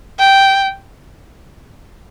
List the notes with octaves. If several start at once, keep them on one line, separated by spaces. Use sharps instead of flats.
G5